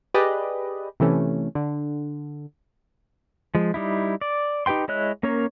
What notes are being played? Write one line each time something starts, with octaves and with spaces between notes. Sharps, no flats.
G4 G#4 B4 D5 D#5
C3 E3 A3 C#4
D3
F3 G#3
G3 D#4 E4
D5
D#4 G4 B4 G5 C6
G#3 E4 C#5 D#5 F#6
A#3 C#4 A#4 C#5